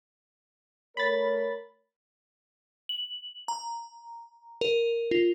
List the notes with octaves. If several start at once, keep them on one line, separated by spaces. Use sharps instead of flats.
A3 A#4 C#5 B5 A6
F#7
A#5
A#4
F4